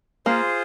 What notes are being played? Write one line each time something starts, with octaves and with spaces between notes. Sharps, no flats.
A#3 F4 G#4 C5